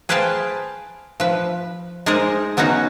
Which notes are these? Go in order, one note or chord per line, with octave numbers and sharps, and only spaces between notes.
G#4 B4 C5 F5 G5 A5
F3 B4
G#3 D#4 G#4 A#4 C5 D#5
F#3 B3 C#4 D#4 F#4